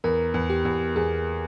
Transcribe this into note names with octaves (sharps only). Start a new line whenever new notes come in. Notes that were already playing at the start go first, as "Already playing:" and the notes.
E2 A#4
E2
G4
E2
E2 G#4